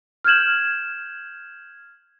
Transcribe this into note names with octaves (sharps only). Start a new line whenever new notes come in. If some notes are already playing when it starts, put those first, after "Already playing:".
F6 G6 G#6 E7 F#7